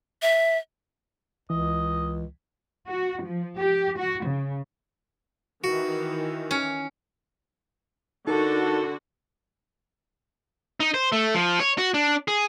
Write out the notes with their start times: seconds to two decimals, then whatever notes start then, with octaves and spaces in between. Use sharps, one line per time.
0.22 E5
1.50 C#2 E3 D#5
2.87 F#4
3.24 F3
3.58 G4
3.98 F#4
4.26 C#3
5.64 D#3 E3 F#4
6.51 C#4
8.27 D3 D#4 F#4 A4 A#4 A5
10.80 D#4
10.94 C5
11.12 A3
11.35 F3
11.60 C#5
11.78 F#4
11.94 D4
12.28 G#4